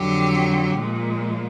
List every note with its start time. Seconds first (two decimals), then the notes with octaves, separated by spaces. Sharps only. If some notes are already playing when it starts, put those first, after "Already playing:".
Already playing: F2 D3 F#3 G4
0.78 A#2 F3 G#3